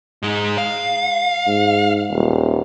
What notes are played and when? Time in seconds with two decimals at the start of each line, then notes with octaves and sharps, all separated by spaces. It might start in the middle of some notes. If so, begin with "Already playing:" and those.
0.23 G#2 G#3
0.58 F5
1.47 G#2
2.10 D#1